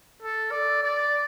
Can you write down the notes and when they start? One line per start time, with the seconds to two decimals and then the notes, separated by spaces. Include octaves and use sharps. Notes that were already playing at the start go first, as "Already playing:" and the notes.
0.22 A4
0.52 D5
0.83 D5